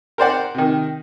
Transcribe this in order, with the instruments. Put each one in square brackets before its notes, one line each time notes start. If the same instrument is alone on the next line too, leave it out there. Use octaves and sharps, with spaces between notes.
[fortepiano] A#4 C5 D5 F#5
C3 D#3